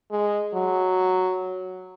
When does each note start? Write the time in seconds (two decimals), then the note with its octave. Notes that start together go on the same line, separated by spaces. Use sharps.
0.11 G#3
0.54 F#3